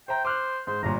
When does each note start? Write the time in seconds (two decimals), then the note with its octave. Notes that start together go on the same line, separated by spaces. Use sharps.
0.08 C5 E5 G5 A#5
0.25 C5 D6 F6 F#6
0.67 G#2 C5
0.83 G1 G2 A#2 A#5